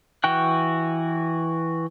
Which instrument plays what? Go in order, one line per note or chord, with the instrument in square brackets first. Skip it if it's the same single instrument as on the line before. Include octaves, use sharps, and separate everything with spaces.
[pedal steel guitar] E3 F#4 G5 F#6